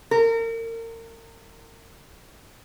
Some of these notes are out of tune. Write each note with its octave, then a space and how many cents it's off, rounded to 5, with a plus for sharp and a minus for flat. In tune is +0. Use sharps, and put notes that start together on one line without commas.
A#4 -35